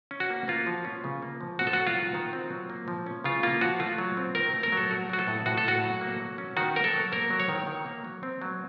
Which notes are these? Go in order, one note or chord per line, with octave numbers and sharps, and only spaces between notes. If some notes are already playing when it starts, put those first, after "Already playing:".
C#4
F#4
A#3
A#3 F4
F3
C#4
C#3
A#3
F3
C4 F#4
A4
F#3 F#4
F4
D#3
D#3
C4
F#3
A#3
F3
C#4
C#3 F4
A#3 F4
F3 F#4
A3 F4
F#3
C4
D#3 A#4
A3
A#4
F#3 A4
A3 F#4
F#3 F#4
A4
A2
A2 F#4
A4
A3 F#4
F#3
A#3
F#3
C#4
D#3 F#4
A#3 A#4
A4
F#3
A#3 A#4
F#3
C#5
D#3
D#3
A#3
F#3
C4
F#3